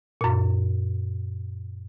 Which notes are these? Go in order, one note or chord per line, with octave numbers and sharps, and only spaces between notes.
F#2 A#2